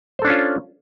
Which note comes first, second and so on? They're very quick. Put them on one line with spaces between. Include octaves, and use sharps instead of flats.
C5 A4 D4 C#4 F4